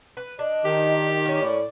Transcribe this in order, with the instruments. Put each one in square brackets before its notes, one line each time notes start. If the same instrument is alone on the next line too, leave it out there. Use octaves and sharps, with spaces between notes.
[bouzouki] B4
[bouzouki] D4 [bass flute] D#5
[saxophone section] D#3 [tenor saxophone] G4
[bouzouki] A#3 C#4
[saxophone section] A2 D5